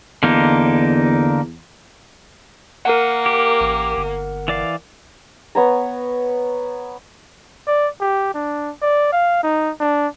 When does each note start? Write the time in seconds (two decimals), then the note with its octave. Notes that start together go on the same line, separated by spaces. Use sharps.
0.23 E2 D3 A#3 D#4
2.85 A#3 A#4 F#5
3.26 G4
3.60 A1
3.97 G1
4.48 E3 D5 F5
5.55 B3 C#5 A#5
7.67 D5
8.01 G4
8.34 D4
8.82 D5
9.13 F5
9.44 D#4
9.80 D4